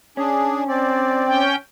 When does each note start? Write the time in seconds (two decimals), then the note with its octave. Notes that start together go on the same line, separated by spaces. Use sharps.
0.17 C#4 D4 G#4
0.69 C4 D5
1.26 C#4 G5